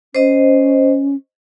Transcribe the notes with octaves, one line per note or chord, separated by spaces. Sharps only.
C#4 C5 D#5